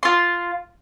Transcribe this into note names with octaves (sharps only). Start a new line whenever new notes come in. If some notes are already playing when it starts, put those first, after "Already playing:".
F4 C6